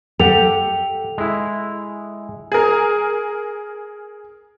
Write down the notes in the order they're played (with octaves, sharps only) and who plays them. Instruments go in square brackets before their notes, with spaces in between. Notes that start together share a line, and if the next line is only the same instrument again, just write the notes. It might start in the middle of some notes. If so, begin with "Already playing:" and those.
[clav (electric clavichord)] G4 [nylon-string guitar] A4 F#5 [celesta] F7
[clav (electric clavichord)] G#3 E4
[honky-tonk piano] G#4 A#4